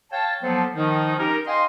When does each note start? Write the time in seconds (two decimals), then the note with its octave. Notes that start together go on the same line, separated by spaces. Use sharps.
0.11 C#5 F5 G5 A5
0.42 F3 F#3 A#3 B3 A4 C5
0.75 D#3 F3 D#4
1.17 C#4 D#4 G4 A#4
1.45 D#5 F5 G5 G#5 C6